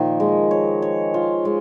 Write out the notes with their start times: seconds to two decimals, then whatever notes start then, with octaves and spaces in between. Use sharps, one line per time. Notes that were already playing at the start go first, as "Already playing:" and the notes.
Already playing: A#2 D#3 F3
0.20 G#3
0.51 C#5
0.82 C#5
1.14 F4
1.45 G#3